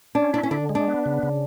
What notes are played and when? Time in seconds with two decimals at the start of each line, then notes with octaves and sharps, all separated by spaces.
0.15 C#4 D4
0.33 D4 E4
0.43 C#4
0.51 D3 D4
0.69 G#3
0.75 D4
0.88 B3
1.06 C#3
1.23 C#3